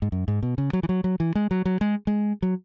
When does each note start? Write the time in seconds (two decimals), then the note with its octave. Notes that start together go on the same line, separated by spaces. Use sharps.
0.02 G#2
0.12 F#2
0.28 G#2
0.43 B2
0.58 C#3
0.73 F#3
0.83 E3
0.89 F#3
1.04 F#3
1.20 E3
1.35 G#3
1.51 F#3
1.65 F#3
1.81 G#3
2.07 G#3
2.42 F#3